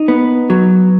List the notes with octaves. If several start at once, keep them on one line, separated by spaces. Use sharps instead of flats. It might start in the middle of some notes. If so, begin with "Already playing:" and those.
Already playing: D#4
B3
F#3